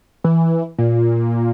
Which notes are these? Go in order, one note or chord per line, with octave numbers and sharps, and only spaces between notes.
E3
A#2